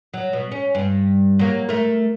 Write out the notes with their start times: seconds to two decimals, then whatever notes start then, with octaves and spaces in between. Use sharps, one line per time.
0.14 F#3
0.33 B2
0.51 C#4
0.75 G2
1.39 F#3 A#3
1.69 A3 A#4